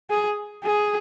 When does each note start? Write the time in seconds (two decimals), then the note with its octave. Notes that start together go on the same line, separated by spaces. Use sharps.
0.10 G#4
0.64 G#4